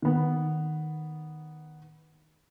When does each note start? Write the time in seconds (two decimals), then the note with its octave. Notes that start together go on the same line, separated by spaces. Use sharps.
0.02 D#3 B3